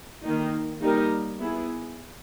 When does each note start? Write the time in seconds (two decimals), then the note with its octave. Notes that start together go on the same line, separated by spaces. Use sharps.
0.23 D#3 A#3 D#4
0.81 G3 A#3 D#4 G4 A#4
1.37 B3 E4 G#4